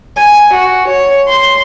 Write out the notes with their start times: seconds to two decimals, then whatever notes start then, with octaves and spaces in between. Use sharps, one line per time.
0.17 G#5
0.53 F#4
0.88 C#5
1.28 C6